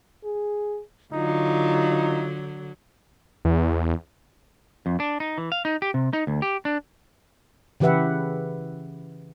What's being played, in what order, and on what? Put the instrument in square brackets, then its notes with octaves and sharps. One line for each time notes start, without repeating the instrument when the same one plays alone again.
[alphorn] G#4
[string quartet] D3 F#3 [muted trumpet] D#4 [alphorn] F4
[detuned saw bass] E2
[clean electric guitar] F2
D4
D#4
E3
F5
D#4
G4
C3
D#4
D2
G4
D4
[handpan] C#3 E3 G4 B4 E5 F#5